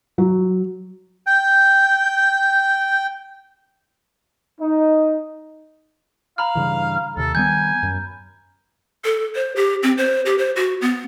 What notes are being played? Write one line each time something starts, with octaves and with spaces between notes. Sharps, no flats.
F#3
G5 G6
D#4
F5 A#5 B5 F6
G2 C#3 E3
D#2 C3 A4
D#3 G3 B3 G#5 G6
F#2
A4
C5
G4
C4
C5
G4
C5
F#4
B3